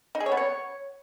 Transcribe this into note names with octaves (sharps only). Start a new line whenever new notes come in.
D#4
G#4
C#5
B3
C#5